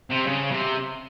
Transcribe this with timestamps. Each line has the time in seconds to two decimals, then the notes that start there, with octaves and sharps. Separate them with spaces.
0.10 C3
0.27 C#3
0.51 C3